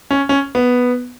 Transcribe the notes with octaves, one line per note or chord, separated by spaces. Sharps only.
C#4
C#4
B3